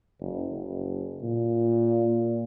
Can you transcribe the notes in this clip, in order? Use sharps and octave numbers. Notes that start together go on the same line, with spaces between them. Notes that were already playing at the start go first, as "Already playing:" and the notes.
F#1
F#1
A#2